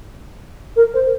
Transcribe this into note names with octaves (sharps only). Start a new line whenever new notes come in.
A#4
C5